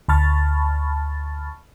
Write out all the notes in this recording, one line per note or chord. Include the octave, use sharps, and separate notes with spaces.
D2 A5 B5 C#6 F6 A6